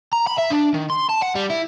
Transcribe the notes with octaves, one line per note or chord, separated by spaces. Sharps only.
A#5
B5
E5
D4
D#3
C6
A5
F#5
G3
E4